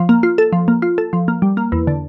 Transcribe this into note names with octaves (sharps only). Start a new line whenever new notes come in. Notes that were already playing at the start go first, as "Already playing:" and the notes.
Already playing: F3
A#3
F4
A4
F3
A#3
F4
A4
F3
A#3
G3
A#3
E2
D3